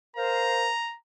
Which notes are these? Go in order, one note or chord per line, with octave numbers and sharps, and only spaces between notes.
A#4 C5 F5 A#5